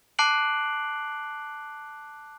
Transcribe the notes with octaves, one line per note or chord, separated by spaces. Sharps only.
A5 D6 F#6 C7 D7 F#7